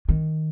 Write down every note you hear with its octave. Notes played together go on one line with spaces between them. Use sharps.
D#3